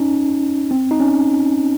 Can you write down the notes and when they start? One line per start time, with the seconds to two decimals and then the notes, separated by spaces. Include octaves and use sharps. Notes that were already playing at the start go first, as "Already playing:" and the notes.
Already playing: C#4 D#4
0.71 C4
0.91 D#4
1.00 C#4